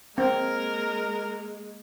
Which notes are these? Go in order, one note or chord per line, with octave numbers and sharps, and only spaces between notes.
G#3 A#3 C4 A#4